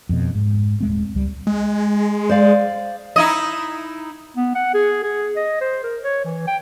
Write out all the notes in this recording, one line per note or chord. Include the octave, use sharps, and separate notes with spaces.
F2 B2
G#2
D#1 G#3 C4
C#2 G3
G#3
C5 D5 F5
D#4 E4 D#5
B3
F#5
G#4
G#4
D#5
C5
A#4
C#5
E3
G5